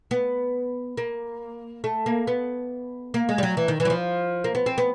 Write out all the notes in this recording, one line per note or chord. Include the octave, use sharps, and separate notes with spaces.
B3
A#3
A3
A#3
B3
A#3
G#3
G3
F#3
E3
D#3
E3
F#3
F3
A#3
B3
C4
B3